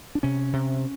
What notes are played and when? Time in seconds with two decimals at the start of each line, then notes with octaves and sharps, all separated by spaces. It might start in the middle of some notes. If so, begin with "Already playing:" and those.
0.15 D4
0.23 C3 C#4
0.53 C3